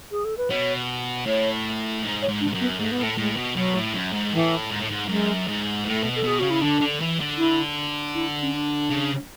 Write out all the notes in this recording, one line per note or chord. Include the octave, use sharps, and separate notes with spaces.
G#4
A4
B4
B2 C#5
A2 C#5
G#2
C#5
G#2
D4
G#2
F#2
B3
G#2 A3
B3
A2
A3
A2 G#3
B2
B2 F#3
A2
F#2
G#2
A2 E3
G#2
A2
G#2
F#2 G#3
G#2
A2 A3
B2
A4
B2 G#4
C#3 F#4
E4
D3 D4
D3
E3
D3
E4
E4
C#4
D4
C#3